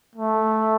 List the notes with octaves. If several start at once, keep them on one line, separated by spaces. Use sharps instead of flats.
A3